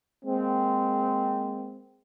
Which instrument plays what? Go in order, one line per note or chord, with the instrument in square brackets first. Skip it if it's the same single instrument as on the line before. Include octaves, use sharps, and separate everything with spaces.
[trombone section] G#3 A#3 C4